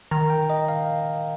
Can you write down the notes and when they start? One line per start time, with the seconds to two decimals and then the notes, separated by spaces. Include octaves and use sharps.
0.11 D#3 A#5
0.30 G5
0.50 D#5
0.68 F5